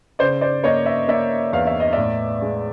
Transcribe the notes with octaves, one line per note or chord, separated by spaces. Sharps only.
C#3 C5 D5
C5 D5
A#3 C#5 D#5
D5 E5
A#3 D5 E5
E2 F5
E5
D#5
A2 D5 E5
G#3